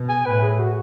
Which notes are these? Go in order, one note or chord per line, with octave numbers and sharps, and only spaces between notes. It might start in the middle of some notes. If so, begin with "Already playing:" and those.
Already playing: B2
G#5
A2 B4
G#4
F#4